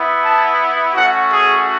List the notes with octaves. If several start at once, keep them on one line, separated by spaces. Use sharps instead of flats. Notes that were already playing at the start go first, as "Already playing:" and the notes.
Already playing: B3 E4
A5
A3 C#4 F#4 F#5
G#4